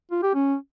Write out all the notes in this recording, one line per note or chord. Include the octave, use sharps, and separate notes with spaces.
F4
G4
C#4